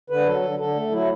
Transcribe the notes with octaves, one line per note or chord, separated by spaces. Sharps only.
D3 B4
F#3 A4
D3
D3 A4
A3
F#3 E4